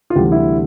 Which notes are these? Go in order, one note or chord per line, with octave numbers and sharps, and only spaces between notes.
F4
D2 C3 E3 G3 G4
E4